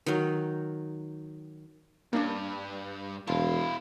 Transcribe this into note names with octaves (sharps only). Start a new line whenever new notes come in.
D#3 F#3
G2 A#3 C#4 D4
E1 E4 F5 A5 C6